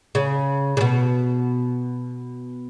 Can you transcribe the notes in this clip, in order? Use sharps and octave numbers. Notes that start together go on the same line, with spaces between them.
C#3
C#3
B2